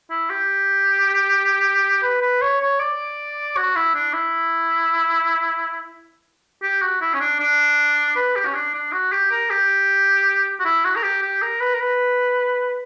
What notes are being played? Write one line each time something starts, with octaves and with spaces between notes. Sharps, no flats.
E4
G4
B4
B4
C#5
C#5
D5
F#4
E4
D4
E4
G4
F#4
E4
C#4
D4
D4
B4
G4
C#4
D4
D4
F#4
G4
A#4
G4
F#4
E4
F#4
A#4
G4
G4
A#4
B4
A#4
B4